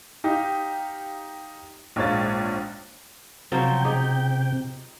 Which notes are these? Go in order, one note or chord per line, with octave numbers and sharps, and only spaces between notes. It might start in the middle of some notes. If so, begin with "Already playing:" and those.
D#4 G4 F5
A#1 G#2 C#5 F5 A6
C3 F3 F#3 F4 G5
D#4 G4 G#4